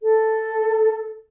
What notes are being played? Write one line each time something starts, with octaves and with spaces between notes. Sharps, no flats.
A4